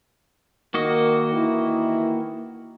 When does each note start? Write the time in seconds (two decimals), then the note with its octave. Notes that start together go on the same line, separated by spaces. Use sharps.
0.74 D#3 A#3 F#4 D#5
1.35 D#3 E3 E4